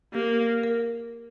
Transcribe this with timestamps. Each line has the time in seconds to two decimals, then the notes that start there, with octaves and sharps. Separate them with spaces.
0.14 A#3 G4
0.63 A#4